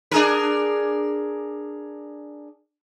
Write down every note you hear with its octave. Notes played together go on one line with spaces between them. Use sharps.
D4 G#4 A#4